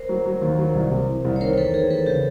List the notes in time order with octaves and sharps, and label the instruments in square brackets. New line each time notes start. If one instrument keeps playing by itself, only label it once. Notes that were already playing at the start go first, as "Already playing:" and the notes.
Already playing: [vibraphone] A#4 C5
[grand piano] F#3
F#3
D#2
F#3
C2
C3
E3
C2
[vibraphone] C#5
[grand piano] D#3 [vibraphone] A#4 C5
[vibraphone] A#4
[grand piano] E2 [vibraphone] A4 B4
[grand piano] D#3 [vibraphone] G#4 A#4
[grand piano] E2 [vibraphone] A4 B4
[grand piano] C#3 [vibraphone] G4 A4